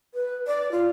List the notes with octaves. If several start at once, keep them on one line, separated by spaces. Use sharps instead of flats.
B4
D5
F4